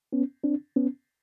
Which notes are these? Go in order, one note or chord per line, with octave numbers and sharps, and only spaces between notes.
B3 C#4
C4 D4
B3 C#4